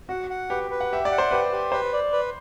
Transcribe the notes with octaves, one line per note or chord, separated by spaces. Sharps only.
F#4 F#5
F#5
G4 B4
B4
F#5
G4 E5
D5
F#5
C5
G4 B4
G4
B4 C5
D5
B4